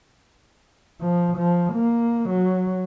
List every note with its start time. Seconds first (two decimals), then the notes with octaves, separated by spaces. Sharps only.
1.01 F3
1.37 F3
1.73 A#3
2.29 F#3